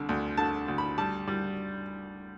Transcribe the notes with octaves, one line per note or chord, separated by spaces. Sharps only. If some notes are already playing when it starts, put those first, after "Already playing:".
Already playing: C2 D3
D2
D3 A5
D2
B5
G3 A5
G3